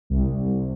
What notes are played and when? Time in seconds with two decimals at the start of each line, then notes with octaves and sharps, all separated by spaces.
0.10 C2